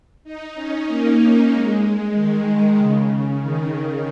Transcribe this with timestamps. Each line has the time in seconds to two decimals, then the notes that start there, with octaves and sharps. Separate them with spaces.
0.24 D#4
0.55 C#4
0.87 A#3
1.50 G#3
2.14 D#3
2.45 D#3
2.77 C#3
3.09 C#3
3.41 D#3